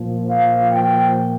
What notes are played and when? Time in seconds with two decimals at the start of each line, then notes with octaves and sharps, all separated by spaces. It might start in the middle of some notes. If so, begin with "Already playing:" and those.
Already playing: A#2 F3
0.27 F5
0.71 G5